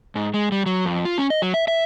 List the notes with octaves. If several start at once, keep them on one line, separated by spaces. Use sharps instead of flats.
G#2
G#3
G3
F#3
F2
F4
C#4
D#5
F#3
E5
E5